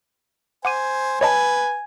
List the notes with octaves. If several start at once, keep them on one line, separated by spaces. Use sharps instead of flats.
C5 F#5 G#5 D6 D#7
B4 C#5 D#5 G#5 A5